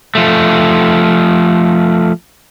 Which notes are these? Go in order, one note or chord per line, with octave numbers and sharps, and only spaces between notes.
F3 A3